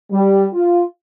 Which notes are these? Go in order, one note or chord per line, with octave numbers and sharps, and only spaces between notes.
G3
F4